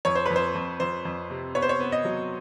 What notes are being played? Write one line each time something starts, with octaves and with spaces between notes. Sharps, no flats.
F2 C#5
C5
F2 B4
C5
F2
F2 C5
F2
C3
B3 C#5
C5
C#5
B3
D#5
F#3